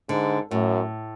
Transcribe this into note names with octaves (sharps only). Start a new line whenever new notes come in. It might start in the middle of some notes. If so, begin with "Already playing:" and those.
G#2 D3
F#2 A2